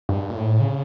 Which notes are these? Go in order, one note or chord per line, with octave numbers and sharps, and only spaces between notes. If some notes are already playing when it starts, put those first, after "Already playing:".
G2
A#2
A2
C#3